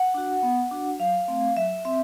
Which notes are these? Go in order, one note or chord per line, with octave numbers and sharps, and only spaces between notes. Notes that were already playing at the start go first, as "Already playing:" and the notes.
Already playing: F#5
D4 F#4
B3
D4 F#4
F#3 F5
A3 C4
F#3 E5
C4 E5